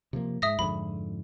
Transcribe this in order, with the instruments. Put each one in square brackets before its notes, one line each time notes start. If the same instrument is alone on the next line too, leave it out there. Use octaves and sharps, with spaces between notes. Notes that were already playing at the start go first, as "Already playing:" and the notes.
[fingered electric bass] C3 F3 A#3
[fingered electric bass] G#2 [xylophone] E5 D#6 A#6
[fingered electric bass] F2 G#2 D3 [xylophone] B5